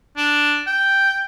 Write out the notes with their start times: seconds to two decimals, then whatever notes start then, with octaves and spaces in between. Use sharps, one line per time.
0.17 D4
0.67 G5